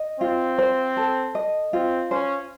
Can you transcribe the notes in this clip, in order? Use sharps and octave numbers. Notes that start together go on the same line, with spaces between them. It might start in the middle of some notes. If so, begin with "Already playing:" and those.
Already playing: D#5
C4 F4
C5
A4
D#5
C4 F4
C#4 C5